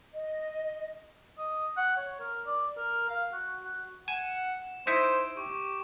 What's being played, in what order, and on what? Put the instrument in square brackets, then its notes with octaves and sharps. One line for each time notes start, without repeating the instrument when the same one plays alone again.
[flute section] D#5
[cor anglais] D#5
F#5
C#5
A#4
D5
A#4
F5
F#4
F#4
[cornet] F#5 [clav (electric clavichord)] G#5 [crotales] E7
[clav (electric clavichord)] D#4 E4 [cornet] C5 [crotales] D7 E7
[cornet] G4 [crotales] C#6